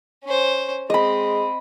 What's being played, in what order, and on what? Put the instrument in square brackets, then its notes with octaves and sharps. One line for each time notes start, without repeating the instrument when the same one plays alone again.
[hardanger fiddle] C#4 C5
[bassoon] G#3 [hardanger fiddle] C4 [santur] D#5 B5